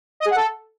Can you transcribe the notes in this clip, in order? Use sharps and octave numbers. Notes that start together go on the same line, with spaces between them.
D#5
G#4
F#5
A4